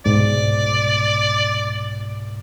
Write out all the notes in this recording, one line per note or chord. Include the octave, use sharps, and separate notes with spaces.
C2 G#2 B2 D5